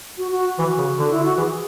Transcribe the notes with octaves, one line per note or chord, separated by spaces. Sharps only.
F#4
F#4
E3 F#4
C#3
D3
E4
F#4
E3 G#4